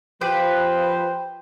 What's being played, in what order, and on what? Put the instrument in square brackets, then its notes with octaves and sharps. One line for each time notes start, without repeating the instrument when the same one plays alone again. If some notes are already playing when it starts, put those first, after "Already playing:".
[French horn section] F3 [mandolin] G4 [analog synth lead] B4 [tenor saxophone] C5